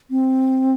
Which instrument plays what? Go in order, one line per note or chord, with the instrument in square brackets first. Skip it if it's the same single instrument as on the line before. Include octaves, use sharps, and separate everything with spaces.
[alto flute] C4